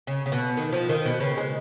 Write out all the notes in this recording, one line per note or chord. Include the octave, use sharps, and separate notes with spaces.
C#3
C#3
B2
D#3
F3
D#3
B2
C#3
G#3